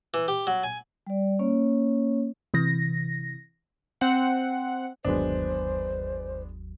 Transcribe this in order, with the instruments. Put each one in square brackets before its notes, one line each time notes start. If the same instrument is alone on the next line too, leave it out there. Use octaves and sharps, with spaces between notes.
[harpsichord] E3
G4
F#3
G#5
[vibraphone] G3 D5
A#3 C#4 C#5
[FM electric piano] C3 E3 A#6
[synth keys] C4 F#5
[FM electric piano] G1 D#2 F#3 [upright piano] G#3 B3 D4 [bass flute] C5